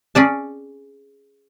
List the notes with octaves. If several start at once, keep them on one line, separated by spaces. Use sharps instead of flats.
C#4 G#4 D5 A5